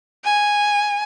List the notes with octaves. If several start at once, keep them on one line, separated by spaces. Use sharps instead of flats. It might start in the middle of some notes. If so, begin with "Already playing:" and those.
G#5